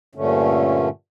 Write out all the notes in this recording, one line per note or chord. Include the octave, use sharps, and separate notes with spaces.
G2 A#2 D3 A3 C#4